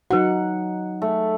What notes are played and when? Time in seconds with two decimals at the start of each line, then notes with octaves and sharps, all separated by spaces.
0.11 F#3 D#4 F#4 B4 F#5
1.02 A3